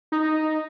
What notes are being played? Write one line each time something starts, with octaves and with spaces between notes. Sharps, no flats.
D#4